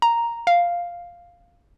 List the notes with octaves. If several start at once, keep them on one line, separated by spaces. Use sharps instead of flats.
A#5
F5